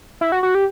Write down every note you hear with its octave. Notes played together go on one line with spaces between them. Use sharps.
E4
F#4
F#4
G4